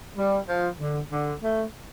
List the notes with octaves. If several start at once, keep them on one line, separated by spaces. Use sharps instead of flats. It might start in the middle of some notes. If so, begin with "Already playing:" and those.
G3
F3
D3
D3
A3